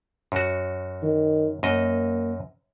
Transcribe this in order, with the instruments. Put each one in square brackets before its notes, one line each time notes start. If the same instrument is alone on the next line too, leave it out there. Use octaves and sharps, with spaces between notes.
[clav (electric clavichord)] F#2 F#4
[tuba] D#3
[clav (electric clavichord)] F#2 D#5 [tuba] A#3